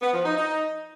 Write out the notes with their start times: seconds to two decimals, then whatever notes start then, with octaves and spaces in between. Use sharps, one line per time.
0.02 B3
0.13 F3
0.25 D#4
0.36 D#4